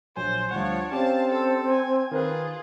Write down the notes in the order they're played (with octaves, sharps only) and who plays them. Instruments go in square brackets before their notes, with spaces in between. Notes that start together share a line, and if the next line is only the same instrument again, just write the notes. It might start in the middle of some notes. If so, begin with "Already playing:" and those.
[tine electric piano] A#1 F#3 G#5 [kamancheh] C5
[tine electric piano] D2 G3 F#5 [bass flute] F3 [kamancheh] D4 C#5
[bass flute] C4 [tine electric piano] C#4 G4 D5 [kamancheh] F5 A5
[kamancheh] A4
G#5
[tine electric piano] D#3 A#4 B4 [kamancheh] F4 G#4